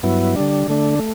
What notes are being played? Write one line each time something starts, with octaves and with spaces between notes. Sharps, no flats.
G2 F#3 B3 E4
D3 G3 D4
D3 A3 D4
A3